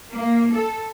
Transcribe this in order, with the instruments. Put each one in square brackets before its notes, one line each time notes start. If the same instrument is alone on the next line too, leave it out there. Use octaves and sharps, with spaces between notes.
[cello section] A#3
A4